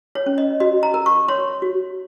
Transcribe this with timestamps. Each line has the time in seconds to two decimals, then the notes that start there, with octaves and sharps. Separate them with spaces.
0.15 C#5
0.26 C#4
0.38 D#5
0.60 F#4 D#5
0.83 A#5
0.94 A#4
1.06 C#6
1.28 C#5 C6
1.62 F#4